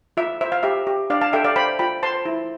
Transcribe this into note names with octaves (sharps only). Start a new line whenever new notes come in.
F4 E5
C5 E5
F5
G4 E5
G4
D4 D5 F5
F5 A5
A4 E5 G5
D5 F5
C5 G5 B5
F4 G5 B5
C5 A5 C6
E4